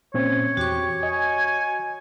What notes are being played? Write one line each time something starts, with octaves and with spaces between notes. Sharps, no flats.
A#2 C4 C#4 C#5
E2 F#4 G4 C#6
D#5 G#5